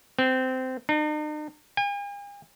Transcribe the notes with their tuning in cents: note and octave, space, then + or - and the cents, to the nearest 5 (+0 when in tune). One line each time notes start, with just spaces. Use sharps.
C4 -20
D#4 -45
G#5 -45